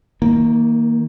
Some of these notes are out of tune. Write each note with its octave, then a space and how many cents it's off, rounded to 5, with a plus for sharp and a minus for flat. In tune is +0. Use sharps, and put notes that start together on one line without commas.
D#3 +35 A#3 -5